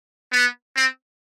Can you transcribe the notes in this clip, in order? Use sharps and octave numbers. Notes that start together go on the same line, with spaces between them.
B3
C4